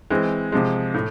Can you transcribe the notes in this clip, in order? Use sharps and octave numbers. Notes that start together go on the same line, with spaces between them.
E3 G#3 C4
C3 F3 G#3
A2